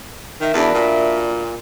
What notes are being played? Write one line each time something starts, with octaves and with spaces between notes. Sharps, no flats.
D#3 A#4 E5
E2 D4 F#4 B4
A#2